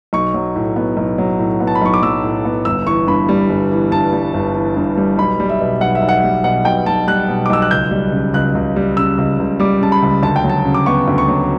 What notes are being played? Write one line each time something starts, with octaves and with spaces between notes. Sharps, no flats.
B1 C#6
F#3
A2
B3
B1
F#3
A2
B3
A5
B5
B1 C#6
D6
F#3 E6
A2
B3
G1 E6
E3 C#6
G2 B5
G3
G1
E3
G2 A5
G3
G1
E3
G2
G3
B1 B5
G3
E5
B2
B1 F#5
E5
B1
F#5
G3
B2 F#5
B1 G5
B1 A5
G3 F#6
B2
D6
B1 E6
F#6
C#2 G6
G3
C#3
C#2 F#6
C#2
G3
C#3 E6
C#2
C#2
G3 D6
C#3 A5
B5
C#2
D2 A5
G5
F#3
A5
C#3
D6
B3 C#6
D2
C#6
F#3